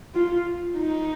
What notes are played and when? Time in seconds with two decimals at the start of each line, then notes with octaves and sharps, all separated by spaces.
0.15 F4
0.78 D#4